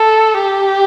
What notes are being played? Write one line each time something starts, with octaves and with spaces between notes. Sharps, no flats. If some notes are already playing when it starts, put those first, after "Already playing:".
Already playing: A4
G4